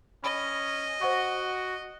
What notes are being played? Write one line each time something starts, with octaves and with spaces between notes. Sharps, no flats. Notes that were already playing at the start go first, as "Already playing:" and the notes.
C#4 D#5 B5
F#4 C5 F#5 C#6